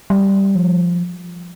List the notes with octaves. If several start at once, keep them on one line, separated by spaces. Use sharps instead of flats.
G3
F3